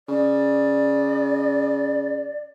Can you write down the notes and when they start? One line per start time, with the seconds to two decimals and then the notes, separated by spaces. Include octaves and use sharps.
0.09 C#3 D5